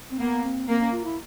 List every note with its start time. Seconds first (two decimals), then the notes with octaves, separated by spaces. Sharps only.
0.11 C4
0.19 A#3 B3
0.44 C4
0.67 A#3 C4
0.80 C#4
0.92 F4
1.04 E4